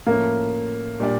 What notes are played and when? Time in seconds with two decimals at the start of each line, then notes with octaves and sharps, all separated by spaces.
0.07 A2 F3 A3 A#3 C#4
1.00 A#2 G3 D4 G4 D5